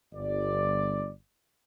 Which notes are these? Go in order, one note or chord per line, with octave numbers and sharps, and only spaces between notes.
G1 D5